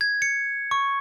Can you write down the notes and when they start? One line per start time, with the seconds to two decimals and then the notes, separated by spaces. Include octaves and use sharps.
0.01 G#6
0.22 C#7
0.71 C#6